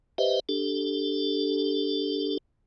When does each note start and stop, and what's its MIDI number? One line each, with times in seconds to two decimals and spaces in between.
0.18 0.40 67
0.18 0.40 71
0.18 0.40 72
0.18 0.40 75
0.18 0.40 76
0.49 2.38 62
0.49 2.38 67
0.49 2.38 69